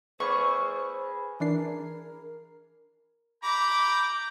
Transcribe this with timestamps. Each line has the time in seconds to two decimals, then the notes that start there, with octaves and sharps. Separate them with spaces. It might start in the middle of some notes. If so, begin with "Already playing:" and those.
0.20 G#4 B4 C5 C#6
1.40 E3 D4 A#4 C7
3.43 A#5 B5 D6 G6